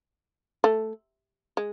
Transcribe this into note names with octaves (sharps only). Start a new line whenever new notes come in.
A3
G#3